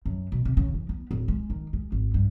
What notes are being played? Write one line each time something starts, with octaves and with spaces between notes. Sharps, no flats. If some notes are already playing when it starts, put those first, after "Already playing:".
F#2
B2
C3
C#3
E3
B3
D1
G#3
D#3
G#3
G#1
G2